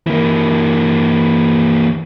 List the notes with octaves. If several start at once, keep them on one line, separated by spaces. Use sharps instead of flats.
E3 A#3